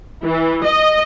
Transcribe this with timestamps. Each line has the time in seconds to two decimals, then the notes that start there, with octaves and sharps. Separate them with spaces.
0.23 E3
0.63 D#5